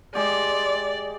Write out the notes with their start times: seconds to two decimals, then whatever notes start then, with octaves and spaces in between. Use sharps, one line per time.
0.15 G#3 G4 D5